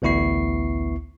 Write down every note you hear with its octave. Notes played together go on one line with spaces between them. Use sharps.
A1 D2 B3 E4 C#6 C7